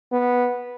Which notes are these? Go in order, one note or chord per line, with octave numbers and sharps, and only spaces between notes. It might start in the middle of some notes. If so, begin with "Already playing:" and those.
B3